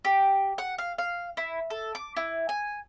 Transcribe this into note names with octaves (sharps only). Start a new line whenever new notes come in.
G4
F#5
F5
F5
E4
A4
D6
E4
G#5